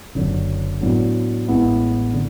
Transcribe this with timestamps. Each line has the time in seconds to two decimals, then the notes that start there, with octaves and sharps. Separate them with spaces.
0.15 F#1 F#2 D3
0.81 A2 F#3 B3 D4
1.47 A1 A2 G#3 B3 E4
2.13 D3